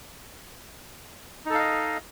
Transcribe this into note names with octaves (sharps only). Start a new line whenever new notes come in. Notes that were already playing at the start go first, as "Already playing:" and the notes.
D#4 A4 D#5 F5